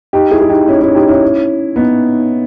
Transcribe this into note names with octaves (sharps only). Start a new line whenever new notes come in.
D#4 G4
E4 G#4
G#4
D#4 G4
C#4 E4
C#4 E4
D#4 G4
C#4 E4
B3 D#4